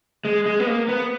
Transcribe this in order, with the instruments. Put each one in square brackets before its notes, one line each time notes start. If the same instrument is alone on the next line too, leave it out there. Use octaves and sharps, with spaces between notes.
[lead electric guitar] G#3
G#3
B3
A#3
B3